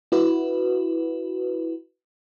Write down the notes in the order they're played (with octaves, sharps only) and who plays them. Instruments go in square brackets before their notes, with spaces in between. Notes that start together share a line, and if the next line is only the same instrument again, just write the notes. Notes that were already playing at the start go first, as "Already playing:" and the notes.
[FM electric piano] E4 F#4 B4